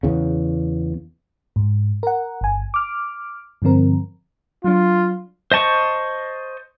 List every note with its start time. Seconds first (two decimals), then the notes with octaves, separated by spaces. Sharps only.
0.03 E2 C#3
1.56 G#2
2.03 A#4 F#5
2.41 G1 G#5
2.74 D6 F6
3.62 G2 D3 F3 C4 A#4
4.64 F#3 D4 F4
5.52 C5 D#5 A5 C#6